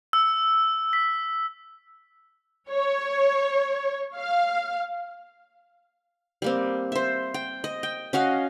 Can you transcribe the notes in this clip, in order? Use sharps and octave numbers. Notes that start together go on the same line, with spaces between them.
E6
B6
C#5
F5
G3 A#3 C4
C5 E5
G5
D#5
G5
C#4 F#4 D#5 F5